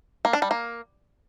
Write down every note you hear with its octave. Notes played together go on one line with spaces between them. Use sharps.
A#3
D4
G3
A#3